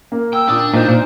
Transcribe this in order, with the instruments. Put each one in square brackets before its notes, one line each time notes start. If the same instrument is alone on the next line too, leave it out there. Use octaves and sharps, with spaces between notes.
[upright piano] A#3
[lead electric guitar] G5 [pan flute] E6
[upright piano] A#2 G5 D#6 [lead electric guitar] D4
[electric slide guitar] A#2 [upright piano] D#4 [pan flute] C5
[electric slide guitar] A#2